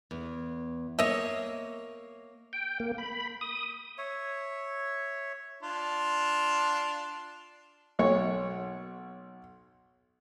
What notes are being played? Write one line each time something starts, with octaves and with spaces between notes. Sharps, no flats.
E2
A#3 C#5 D#5 E5
G5
A#3
B5
D#6
C#5 E5
D4 F4
B1 C#5